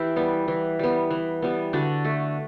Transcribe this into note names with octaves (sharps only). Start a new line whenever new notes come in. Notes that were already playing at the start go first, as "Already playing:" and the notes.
Already playing: E3 E4 G4
G3 B3
E3
G3 B3
E3
G3 B3
D3 D4 F#4
A3